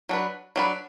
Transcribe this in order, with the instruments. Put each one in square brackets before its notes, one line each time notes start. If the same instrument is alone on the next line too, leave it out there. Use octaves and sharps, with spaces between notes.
[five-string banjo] F#3 D4 B4
F#3 D4 B4